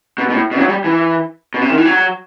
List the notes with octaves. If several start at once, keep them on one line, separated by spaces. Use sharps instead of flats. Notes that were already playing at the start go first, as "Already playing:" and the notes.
B2
B2
A2
B2
F#3
G3
E3
B2
C3
D#3
E3
F#3